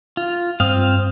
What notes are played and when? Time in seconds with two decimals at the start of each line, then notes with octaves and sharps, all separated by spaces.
0.17 F4
0.60 G2 C4 F5 D#6 F6